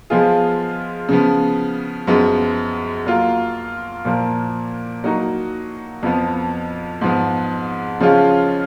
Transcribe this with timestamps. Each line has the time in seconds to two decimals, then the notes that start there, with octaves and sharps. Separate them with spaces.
0.10 F3 G#3 B3 F4 G#4
1.09 C#3 F3 B3
2.07 F#2 F3 G#3 B3
3.06 F#3 A#3 F4
4.05 A#2 F3 A#3
5.04 F#3 A#3 D#4 F#4
6.03 F2 F3 B3
7.01 G#2 F3 B3
8.00 C#3 F3 G#3 C#4 F4